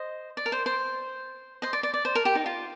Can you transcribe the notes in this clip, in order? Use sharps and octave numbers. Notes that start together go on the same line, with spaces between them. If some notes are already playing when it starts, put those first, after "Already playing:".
Already playing: C5 D#5
D5
A#4
C5
C5
C5 D#5
D5
D5
D5
C5
A#4
G4
D#4
F4